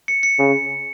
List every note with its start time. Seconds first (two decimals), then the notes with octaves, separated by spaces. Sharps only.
0.08 C#7
0.23 C#7
0.39 C#3